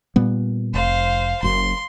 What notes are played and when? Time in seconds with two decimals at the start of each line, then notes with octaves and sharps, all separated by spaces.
0.16 A#2 G3 B3
0.74 F1 C5 F5
1.43 F#1 F#2 C6